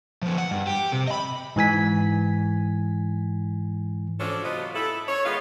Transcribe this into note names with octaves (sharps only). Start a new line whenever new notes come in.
F3 B3
F#5
G2
G4
C3
D#5 B5
G#2 E3 G#5 B6
F3 C#4 D4 F#4 A4
C3 F#3 B3 F4 F#4 D#5
E4 A4
C#5
D#3 G#3 B3 F4 B4 F5